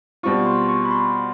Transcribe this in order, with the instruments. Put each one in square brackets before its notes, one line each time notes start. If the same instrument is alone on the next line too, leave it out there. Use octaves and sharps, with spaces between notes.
[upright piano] B2 G3 C4 F4 [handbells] C#6
[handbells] C6
C#6
B5
C6